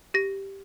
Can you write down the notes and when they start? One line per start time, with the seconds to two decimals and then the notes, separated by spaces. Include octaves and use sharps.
0.14 G4 A#6